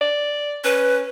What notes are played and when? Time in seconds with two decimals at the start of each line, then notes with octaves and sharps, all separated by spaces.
0.01 D5
0.64 C#4 B4